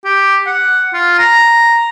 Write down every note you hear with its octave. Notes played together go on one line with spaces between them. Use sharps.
G4
F#5
F4
A#5